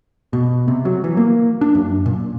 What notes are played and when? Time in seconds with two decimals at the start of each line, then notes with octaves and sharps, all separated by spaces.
0.33 B2
0.68 C3
0.85 F#3
1.04 E3
1.17 A#3
1.61 D4
1.75 F#2
2.06 A#2